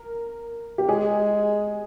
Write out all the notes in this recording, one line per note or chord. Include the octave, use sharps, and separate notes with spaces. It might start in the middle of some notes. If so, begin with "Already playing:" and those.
Already playing: A#4
G4
G#3 G#4